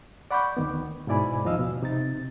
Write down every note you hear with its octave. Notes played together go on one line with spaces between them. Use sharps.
D5 F#5 B5 C#6 D6 G6
D2 D#3 B3
G#2 B2 E4 D5 G#5 B5
D#2 F3 D#4 D#5 F5 E6
B2
C3 D#4 A6